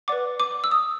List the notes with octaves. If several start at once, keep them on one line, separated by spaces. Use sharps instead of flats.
B4 D5 F#5 D6
D6
E6
D#6